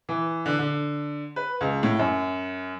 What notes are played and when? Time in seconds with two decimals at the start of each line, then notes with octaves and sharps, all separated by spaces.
0.09 E3
0.46 D3
0.59 D3
1.36 B4
1.61 C#2
1.83 A2
1.99 F#2